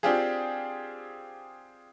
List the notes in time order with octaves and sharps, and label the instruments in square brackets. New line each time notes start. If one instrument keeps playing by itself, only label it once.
[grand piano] C4 D4 F4 G4 G#4